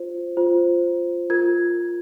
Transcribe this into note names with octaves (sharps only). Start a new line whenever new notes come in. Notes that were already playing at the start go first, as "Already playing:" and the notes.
Already playing: F4 C5
F4 C5
F4 A#4 G#6